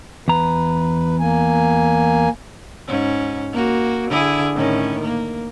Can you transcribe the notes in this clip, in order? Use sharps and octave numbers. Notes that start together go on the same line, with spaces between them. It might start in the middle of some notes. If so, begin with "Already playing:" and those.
E2 B4 A#5
A#3 G#5
G#2 C#4
A#3 F#4
D3 E4 G#4
A2 D#3 C#4
A#3